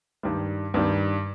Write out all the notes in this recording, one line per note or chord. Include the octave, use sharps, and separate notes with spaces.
G2 D#3 G3
G2 D#3 G3